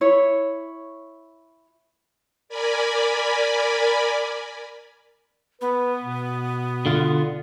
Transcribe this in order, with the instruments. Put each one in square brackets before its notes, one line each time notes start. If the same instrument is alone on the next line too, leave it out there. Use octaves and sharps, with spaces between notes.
[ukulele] E4 C#5
[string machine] A#4 D5 G#5 B5
[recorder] B3 [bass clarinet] B4
[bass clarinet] B2
[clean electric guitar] D3 F4